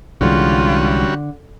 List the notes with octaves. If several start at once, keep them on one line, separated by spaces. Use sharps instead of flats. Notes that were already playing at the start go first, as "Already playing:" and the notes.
C2 D3 E3 G3 G#3 C#4 F4 F#4